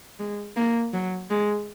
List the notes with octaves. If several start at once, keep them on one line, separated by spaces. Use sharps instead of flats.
G#3
A#3
F#3
G#3